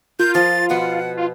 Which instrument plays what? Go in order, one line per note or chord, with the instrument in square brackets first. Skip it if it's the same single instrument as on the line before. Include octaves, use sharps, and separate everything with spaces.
[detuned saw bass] F4 [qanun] A#4 [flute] G6
[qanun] F3 [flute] A6
[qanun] B2 F3 B3 [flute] F#5
[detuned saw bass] F4